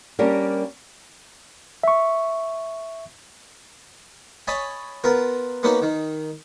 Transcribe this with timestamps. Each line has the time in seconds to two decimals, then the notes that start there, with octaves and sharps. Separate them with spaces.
0.19 G3 A#3 C#4 D4 G4 A#4
1.83 E5 C#6
4.47 C#5 D#5 G#5 A5 B5
5.04 B3 F4 A#4
5.63 A#3 B3 C#4 D#4 F#4
5.82 D#3